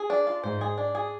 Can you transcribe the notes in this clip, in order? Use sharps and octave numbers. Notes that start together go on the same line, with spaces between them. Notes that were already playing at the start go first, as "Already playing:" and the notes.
Already playing: G#4
D4
F4
G#2 C5
G#4
D4
G#4